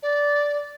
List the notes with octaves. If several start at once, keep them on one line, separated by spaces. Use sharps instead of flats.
D5